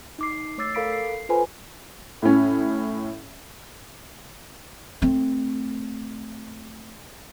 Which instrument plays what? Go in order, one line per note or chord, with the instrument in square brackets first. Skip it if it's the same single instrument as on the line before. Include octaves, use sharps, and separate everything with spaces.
[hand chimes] D#4 D6 C7
A3 C#5 D6 E6 A6 C7
A4 A#4 F5 B5 B6 D7
C7
F4 A4 B4 C5 G#5 B5
[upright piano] A2 C#4
[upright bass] A3 C4